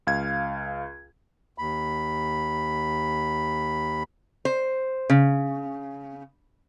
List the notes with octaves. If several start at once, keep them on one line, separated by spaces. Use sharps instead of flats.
C#2 F5 G#6
D#2 B5
C5
C#3